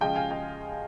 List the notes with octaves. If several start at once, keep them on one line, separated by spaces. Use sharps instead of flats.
C#3 F3 G#3 C#4 F4 D#5 G5
F5 G#5
D#5 G5